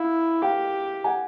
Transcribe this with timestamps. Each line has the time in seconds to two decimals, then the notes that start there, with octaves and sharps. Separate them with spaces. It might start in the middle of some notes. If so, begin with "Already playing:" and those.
Already playing: E4 F5
0.42 G4 F5 G5
1.04 F#5 G#5